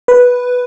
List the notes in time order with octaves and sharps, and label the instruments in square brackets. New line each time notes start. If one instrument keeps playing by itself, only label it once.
[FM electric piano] B4